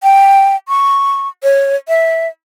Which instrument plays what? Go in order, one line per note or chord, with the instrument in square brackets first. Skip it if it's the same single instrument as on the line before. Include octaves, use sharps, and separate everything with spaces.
[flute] G5
C#6
C#5
E5